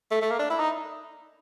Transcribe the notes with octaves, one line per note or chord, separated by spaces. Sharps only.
A3
A3
A#3
D4
E4
D#4